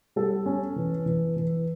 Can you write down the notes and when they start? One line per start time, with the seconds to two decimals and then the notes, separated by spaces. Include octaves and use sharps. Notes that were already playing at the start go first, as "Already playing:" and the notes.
0.16 G3 A4
0.46 C#4
0.76 E3
1.06 E3
1.36 E3